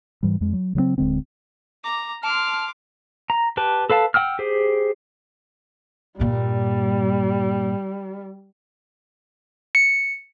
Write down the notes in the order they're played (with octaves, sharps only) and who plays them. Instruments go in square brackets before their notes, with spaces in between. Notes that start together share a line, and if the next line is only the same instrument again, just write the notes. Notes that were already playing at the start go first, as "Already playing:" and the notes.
[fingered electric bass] G#2 E3 G3
F2 G#3
F#3
C#3 F#3 G#3 C4
D1 D3 G#3 C4
[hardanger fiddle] A#5 [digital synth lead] D6
[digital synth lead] A5 [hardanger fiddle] C6 D6 [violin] F6
[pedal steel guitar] A#5
G4 B4 A5
A4 B4 F5 A5
F#5 G5 E6 F6
G4 G#4 C5
[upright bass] G2 A#2 [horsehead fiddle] G3
[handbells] C#7